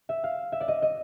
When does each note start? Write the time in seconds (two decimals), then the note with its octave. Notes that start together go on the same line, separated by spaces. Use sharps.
0.09 E5
0.24 F5
0.52 E5
0.60 D5
0.68 D#5
0.82 D#5